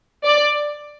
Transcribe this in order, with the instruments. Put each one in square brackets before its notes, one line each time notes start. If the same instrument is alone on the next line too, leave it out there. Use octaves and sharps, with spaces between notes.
[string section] D5